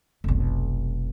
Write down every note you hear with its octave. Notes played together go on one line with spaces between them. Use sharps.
F1 B1